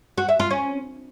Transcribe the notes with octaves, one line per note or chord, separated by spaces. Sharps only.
F#4
E5
F4
C#4